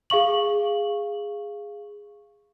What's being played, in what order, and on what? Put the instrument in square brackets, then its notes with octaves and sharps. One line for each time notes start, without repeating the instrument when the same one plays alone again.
[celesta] G#4 F5 C#6 F#7